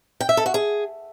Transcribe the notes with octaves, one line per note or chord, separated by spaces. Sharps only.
G5
E5
A4
F#4
G#4